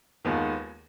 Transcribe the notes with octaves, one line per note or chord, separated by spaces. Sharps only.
D#2 D#3 G#3 B3 F4